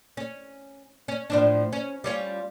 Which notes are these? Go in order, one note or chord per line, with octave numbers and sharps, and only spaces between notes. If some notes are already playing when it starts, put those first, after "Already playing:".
C#4
C#4
A2 F3 D4
C#4
G3 C#4 F4